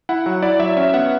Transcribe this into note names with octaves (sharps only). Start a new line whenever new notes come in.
E4 F#5
F#3 F#5
E4 D5
F#3 E5
C#4 E5
B3 F#5